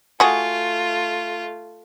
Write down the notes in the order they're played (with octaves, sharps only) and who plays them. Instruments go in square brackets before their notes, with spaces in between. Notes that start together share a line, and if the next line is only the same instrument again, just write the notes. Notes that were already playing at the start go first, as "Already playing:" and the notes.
[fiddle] A3 F4 [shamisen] F#4 G#4